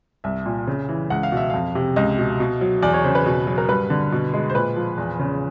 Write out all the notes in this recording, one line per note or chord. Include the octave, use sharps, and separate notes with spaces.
C2 E5
A#2
C#3
E3
C#2 F#5
F5
B2 E5
F2 F5
C3
C#2 D#5
B2
B2
F#3
E2 D5
C#5
C#3 C5
B4
B2
F#3
A#4
G2 B4
D3
B2
G#3
C5
A#2 B4
F3
E2
C#3